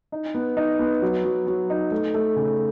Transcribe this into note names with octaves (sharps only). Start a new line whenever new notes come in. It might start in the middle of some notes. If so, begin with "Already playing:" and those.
D#4
B3
D#4
B3
F#3
F#3
F#3
D#4
A3
A3
C#3